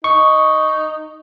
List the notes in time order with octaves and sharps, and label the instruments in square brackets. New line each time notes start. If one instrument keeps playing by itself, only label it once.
[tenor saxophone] D#4 [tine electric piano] C#6